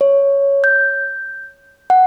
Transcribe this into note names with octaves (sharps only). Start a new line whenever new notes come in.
C#5
G6
F#5